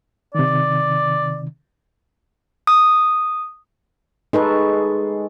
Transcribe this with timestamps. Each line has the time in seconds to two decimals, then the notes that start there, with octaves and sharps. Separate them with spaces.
0.35 C3 D#3 D5
2.67 D#6
4.33 G#3 D#4 A4 B4 C6 C#6